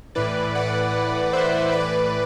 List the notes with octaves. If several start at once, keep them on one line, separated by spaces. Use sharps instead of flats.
A2 E3 B4 D5
D5 F#5
C5 E5
A2 E3 B4 D5